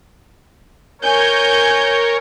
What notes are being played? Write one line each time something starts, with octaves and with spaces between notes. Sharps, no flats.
A#4 C#5 G#5 G6